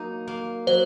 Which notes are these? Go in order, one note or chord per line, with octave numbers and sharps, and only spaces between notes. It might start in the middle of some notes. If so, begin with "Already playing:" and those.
Already playing: F#3 A#3 D#4
A#3
F#3 C5